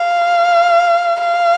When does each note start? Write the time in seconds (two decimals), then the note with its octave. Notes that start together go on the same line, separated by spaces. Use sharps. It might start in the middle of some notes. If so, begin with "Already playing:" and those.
Already playing: F5
1.20 F5